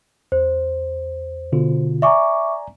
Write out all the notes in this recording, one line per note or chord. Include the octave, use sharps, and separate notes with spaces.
E2 C5
B2 D3 F4
D5 E5 G#5 A#5 C#6 D6